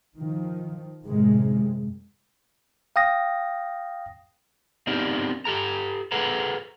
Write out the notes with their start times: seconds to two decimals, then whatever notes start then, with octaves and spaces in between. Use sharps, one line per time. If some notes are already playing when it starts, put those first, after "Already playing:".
0.17 D#3 F3
1.05 F#2 A2 C3 D#3 G#3
2.96 F5 G5 D#6 A#6
4.87 B3 C4 D4 D#4 G4 A#4
5.45 G4 A4 A#5
6.12 G#4 A4 B4 F#5 A#5